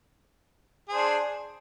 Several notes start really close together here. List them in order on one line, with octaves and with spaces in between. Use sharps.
G#4 C5 D4